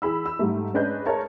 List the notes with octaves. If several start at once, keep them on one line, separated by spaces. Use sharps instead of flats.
E3 G#4 B5 E6
E6
G#2 G3 A3
G#3 C#4 D4 B4 D#5 G6
G#4 A#4 C#5 D#5 A5